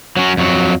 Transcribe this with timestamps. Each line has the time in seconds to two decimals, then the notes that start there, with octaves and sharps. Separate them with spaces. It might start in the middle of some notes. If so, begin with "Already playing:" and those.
0.17 F#3 C#4
0.37 F2 F#3